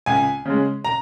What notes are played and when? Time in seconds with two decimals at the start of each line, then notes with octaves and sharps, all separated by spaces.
0.06 C#2 G#5
0.45 C#3 G#3
0.85 A#5